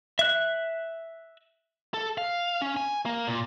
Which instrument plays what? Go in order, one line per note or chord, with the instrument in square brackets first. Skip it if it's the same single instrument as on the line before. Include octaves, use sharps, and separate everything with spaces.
[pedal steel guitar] E5 F#6
[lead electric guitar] A4
F5
C#4
G#5
A#3
A#2